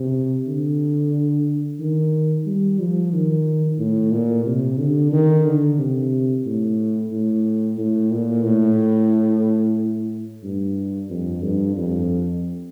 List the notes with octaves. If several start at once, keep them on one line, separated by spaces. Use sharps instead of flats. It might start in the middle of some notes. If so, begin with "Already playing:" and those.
Already playing: C3
D3
D#3
G3
F3
D#3
A2
A#2
C3
D3
D#3
D3
C3
A2
A2
A2
A#2
A2
G2
F2
G2
F2